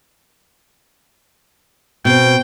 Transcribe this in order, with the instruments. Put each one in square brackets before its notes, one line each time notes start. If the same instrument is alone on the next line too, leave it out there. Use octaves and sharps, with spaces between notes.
[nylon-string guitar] B2 C4 [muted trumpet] G5